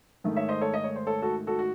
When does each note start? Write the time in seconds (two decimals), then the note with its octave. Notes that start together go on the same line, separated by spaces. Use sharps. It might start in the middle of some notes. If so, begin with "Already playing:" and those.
0.24 G#2 D#3 A3
0.37 C#5 E5
0.49 C5 D#5
0.61 A4 C#5
0.74 D#5
0.84 C#5
0.96 C5
1.07 A4 C#5
1.22 F#4 A4
1.47 F#4 A4
1.59 F#4